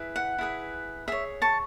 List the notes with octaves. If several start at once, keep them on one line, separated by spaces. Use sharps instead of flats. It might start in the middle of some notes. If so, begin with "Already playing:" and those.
Already playing: E4 G#4 B4
F#5
E4 G#4 B4
G#4 C#5 E5
A5 C#6